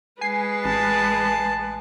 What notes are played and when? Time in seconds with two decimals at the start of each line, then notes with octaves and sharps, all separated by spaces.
0.21 G#3 B4 G#5 C7
0.65 A1 A5